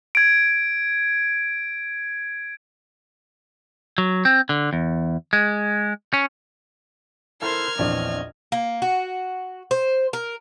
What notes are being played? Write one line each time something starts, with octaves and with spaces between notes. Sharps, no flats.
G#6 D7
F#3
C4
D3
E2
G#3
C#4
E4 A4 A#4 C5 E5 F6 G#6
A#1 E2 C4 D4 C#5 D#5
A#3
F#4
C5
A#4